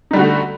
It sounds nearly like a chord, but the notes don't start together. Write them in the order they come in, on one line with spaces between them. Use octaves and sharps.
D#4 G3 D3 F#4 A3